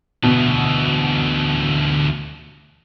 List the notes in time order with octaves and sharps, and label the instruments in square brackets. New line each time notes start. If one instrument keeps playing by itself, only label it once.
[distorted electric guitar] D2 E3 [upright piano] B2